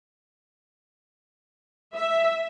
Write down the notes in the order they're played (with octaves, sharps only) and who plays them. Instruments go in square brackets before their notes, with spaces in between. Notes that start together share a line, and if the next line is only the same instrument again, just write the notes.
[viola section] E5